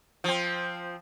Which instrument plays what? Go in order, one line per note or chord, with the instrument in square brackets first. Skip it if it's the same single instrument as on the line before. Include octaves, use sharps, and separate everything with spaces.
[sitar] F3 C4